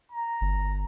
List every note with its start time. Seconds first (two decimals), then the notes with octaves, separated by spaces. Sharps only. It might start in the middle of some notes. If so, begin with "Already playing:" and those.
0.12 A#5
0.41 G1